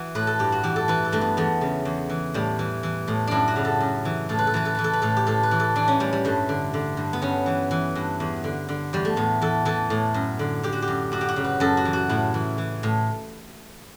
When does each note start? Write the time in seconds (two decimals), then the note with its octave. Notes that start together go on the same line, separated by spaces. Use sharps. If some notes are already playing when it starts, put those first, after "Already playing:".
Already playing: E3 F#4
0.15 A2 B4
0.27 A4
0.39 G2 G4
0.52 F#4
0.63 E3 G4
0.76 A4
0.88 E3 B4
1.05 A4
1.12 G2 A3
1.21 B3
1.37 E2 A3
1.61 C#3
1.85 E2
2.09 E3
2.34 A2 G3
2.59 E3
2.83 E3
3.08 A2
3.27 F#2 D4 E4
3.48 F#4
3.56 C#3
3.65 A4
3.80 F#2
4.05 E3
4.29 A2 A4
4.39 B4
4.47 A4
4.54 E3 B4
4.65 A4
4.75 E3 B4
4.84 A4
4.93 B4
5.02 A2 A4
5.16 G4
5.26 A2 A4
5.43 B4
5.51 E3
5.60 A4
5.75 E3 D4
5.88 C#4
6.00 A2 G3
6.13 G3
6.25 G2 A3
6.49 D3
6.74 D3
6.97 G2
7.13 B3
7.22 G2 C#4
7.46 E3
7.71 E3
7.95 G2
8.20 E2
8.44 D3
8.69 D3
8.93 E2 G3
9.05 A3
9.16 A2 B3
9.41 E3 A4
9.65 E3 A4
9.90 A2
10.14 F#2
10.39 D3
10.63 D3 G4
10.73 F#4
10.82 G4
10.88 F#2
11.12 F#2 F#4
11.21 G4
11.29 F#4
11.36 C#3
11.44 B4
11.60 F#2 A4
11.77 F#4
11.85 E3
11.93 F#4
12.09 A2 E4
12.34 E3
12.58 E3
12.83 A2